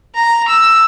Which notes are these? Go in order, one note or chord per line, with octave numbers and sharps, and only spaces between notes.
A#5
E6